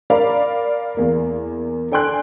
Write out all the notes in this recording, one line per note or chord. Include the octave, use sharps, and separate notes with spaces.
A#4 D5 F5 B5
E2 A#3
A4 D5 G5 G#5 C6 F#6